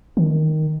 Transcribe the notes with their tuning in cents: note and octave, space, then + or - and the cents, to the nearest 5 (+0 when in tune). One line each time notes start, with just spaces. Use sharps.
D#3 +0